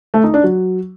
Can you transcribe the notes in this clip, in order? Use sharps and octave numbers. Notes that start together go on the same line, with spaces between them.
A3
D#4
D4
F#3